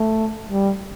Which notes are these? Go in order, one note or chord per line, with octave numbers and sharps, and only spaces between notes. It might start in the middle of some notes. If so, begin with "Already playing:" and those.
Already playing: A3
G3